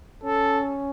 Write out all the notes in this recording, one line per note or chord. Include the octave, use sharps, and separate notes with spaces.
C#4 A4